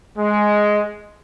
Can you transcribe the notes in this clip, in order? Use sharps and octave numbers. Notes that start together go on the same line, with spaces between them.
G#3